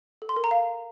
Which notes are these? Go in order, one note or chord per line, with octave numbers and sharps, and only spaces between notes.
A4
C6
A#4
A#5
F5